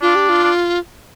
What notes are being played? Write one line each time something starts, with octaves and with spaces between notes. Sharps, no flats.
D4 F4
G4
F4
D4